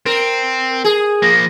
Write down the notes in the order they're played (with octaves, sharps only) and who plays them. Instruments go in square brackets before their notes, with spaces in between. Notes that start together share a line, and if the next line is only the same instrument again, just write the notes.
[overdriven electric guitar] C4 [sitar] A#4
[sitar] G#4
[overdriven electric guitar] F3 A#3 [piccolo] A#6